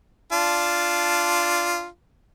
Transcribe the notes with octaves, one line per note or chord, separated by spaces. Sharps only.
D4 F4 A5